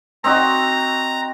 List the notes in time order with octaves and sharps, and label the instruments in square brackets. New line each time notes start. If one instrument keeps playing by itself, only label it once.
[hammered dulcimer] C4 D#4 F#4 [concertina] A#5